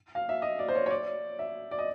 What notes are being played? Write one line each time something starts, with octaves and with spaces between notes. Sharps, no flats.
F5
E5
D#5
D5
C5
C#5
C#5
D5
E5
D5
D#5